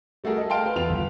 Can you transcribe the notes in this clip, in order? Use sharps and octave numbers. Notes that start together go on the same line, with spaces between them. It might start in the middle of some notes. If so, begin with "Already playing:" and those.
G3 A3 F#4 G#4 A#4
A4 D#5
F5 G5 A5 C6 F6 D7
B4 F5
E2 F4 B4 F7
G1